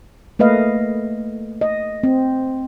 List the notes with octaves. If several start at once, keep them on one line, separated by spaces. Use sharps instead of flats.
A3 A#3 B4 D#5 F5
D#5
C4